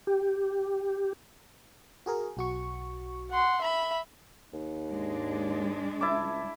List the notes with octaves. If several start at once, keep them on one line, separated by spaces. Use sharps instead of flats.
G4
F#4 G#4 A#4
B1 F#4 C#6
F#5 C6
E5 B5
D#2
G#2 G#3 D4
C#2 E4 A5 D6